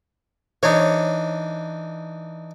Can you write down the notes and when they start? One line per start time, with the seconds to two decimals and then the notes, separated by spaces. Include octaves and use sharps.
0.63 E3 D4 D#4 C#5